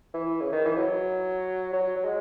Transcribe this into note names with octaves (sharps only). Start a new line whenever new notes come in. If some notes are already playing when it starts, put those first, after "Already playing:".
E3
C#3
D#3
E3
F#3
F#3
F#3
G#3